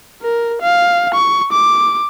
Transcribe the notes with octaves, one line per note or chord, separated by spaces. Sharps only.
A#4
F5
C#6
D6